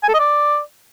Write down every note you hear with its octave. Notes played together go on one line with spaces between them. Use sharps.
G#5
A4
D#5
D5